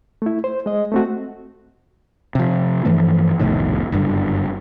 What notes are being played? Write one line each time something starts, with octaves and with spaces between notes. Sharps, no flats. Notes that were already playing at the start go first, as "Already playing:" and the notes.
A3 E4
C5
G#3 D#5
A3 C4 F#4
C3 F3
G2 E3 F3 A3
F1 B1 A2 D#3
F#1 G2 D3